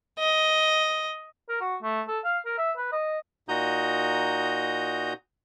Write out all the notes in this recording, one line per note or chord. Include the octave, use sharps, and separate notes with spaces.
D#5
A#4
F#4
A3
A4
F5
A#4
E5
B4
D#5
A#2 D#4 F#4 A#5 D#6 G6